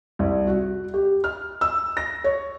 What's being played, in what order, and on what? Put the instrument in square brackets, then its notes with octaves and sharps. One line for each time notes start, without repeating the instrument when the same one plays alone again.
[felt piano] C2
F#4
G4
F6
E6
A#6
C#5